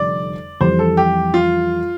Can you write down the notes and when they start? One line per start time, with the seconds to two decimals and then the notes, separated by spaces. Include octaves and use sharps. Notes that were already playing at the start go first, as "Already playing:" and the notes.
Already playing: F1 F2 D3 G3 D5
0.60 F2 E3 G3 C5
0.79 A4
0.97 G4
1.34 F4